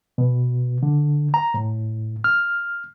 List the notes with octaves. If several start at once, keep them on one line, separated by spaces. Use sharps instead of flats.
B2
D3
A#5
A2
F6